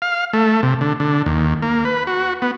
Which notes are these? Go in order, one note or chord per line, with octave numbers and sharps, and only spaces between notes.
F5
A3
C3
D3
D3
D#2
A#3
B4
F#4
B3